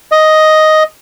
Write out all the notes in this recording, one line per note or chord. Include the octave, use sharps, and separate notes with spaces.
D#5